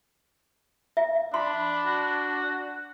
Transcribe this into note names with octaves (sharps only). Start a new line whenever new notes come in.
E5
D4 B5 C6
F#4